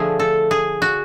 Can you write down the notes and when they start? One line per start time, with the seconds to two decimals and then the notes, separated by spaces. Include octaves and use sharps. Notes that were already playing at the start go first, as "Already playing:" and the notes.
Already playing: D3 F3 A3 G#4
0.19 A4
0.51 G#4
0.82 F#4